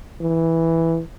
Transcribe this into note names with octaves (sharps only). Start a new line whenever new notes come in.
E3